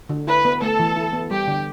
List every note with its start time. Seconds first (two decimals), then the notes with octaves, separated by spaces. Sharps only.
0.09 D3
0.27 E4 B4
0.45 B3
0.62 A3 A4
0.79 E3
0.96 E4
1.13 B3
1.30 G3 G4
1.48 D3